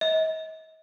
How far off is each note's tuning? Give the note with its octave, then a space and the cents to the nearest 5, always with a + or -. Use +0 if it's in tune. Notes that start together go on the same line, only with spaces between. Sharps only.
D#5 +40